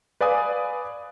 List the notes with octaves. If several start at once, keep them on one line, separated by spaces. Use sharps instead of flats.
B4 D5 F5 G#5 D#6